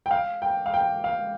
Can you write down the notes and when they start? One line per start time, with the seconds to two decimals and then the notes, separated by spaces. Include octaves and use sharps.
0.06 G5
0.11 F5
0.42 G5
0.66 F5
0.74 G5
1.04 F5